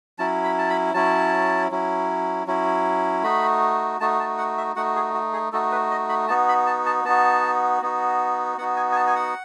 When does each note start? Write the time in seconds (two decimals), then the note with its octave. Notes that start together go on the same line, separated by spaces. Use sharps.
0.18 F#3 C#4 E4 A5
0.44 B5
0.58 A5
0.70 B5
0.94 F#3 C#4 E4 A5
1.71 F#3 C#4 E4
2.47 F#3 C#4 E4
3.23 A3 D#4 F#4 B5
4.00 A3 D#4 F#4 A5
4.20 A5
4.38 F#5
4.57 E5
4.76 A3 D#4 F#4 F#5
4.96 G#4
5.14 F#4
5.33 G#4
5.52 A3 D#4 F#4 A4
5.72 B4
5.91 D#5
6.09 B5
6.28 B3 D#4 F#4 A5
6.48 B5
6.67 A5
6.86 A5
7.05 B3 D#4 F#4 A5
7.82 B3 D#4 F#4
8.58 B3 D#4 F#4 F#5
8.76 G#5
8.92 G#5
8.96 A5
9.07 G#5
9.16 F#5